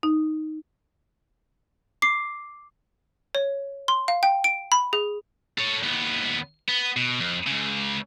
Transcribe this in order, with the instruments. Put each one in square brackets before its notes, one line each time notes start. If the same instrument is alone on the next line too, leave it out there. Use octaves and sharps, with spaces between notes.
[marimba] D#4
[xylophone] D6 C7
C#5
C6
F5
G5
D7
B5
G#4
[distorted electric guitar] A4 C#5
D#2 B3
B3
B2
F2
C#2 C#3